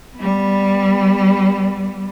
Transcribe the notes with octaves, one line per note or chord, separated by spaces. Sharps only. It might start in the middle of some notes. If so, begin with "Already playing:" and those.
G3 B3